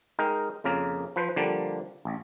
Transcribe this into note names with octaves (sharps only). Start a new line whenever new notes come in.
G#3 D#4 A#4 G5
F2 C#3 A#3 A#4
F3 B4 C5
D3 F3 G3 A#3
A1